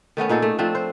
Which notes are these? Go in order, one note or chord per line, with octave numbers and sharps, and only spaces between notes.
D#3 A3 B3 C#4
A#2 D#4 G#4 A4
A3
F3 A3 C4 D4
C5